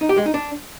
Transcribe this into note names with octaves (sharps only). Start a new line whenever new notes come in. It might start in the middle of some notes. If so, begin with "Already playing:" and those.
D#4
G4
G#3
D#4
D4